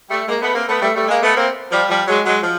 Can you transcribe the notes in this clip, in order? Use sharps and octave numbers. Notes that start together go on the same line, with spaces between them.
G3 A3
G#3 A#3
A3 B3
A#3 C4
A3 B3
G3 A3
G3 A3
G#3 A#3
A3 B3
A#3 C4
F3 G3
F3 G3
F#3 G#3
F#3 G#3
F3